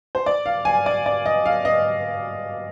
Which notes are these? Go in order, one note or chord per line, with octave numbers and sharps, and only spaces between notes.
C5
D5
F5
G#5
D5
D5
D#5
F5
D#5